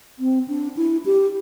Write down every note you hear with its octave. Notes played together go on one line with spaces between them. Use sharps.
C4
D4
E4
G4